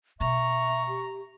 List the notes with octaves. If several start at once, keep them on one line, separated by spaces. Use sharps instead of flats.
B2 G#3 E5 A#5 C#6
G4